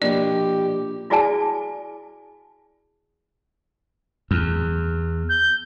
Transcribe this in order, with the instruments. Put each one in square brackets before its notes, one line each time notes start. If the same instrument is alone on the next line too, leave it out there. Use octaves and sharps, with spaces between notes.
[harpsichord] A#1 B2 G#5 [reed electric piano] A#3 D4 [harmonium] G4 [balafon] D5
[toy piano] E4 F#4 G#4 D5 G#5 A5
[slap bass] E2
[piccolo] G6